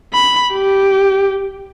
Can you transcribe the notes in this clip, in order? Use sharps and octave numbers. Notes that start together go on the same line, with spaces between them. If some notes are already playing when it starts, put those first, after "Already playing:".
B5
G4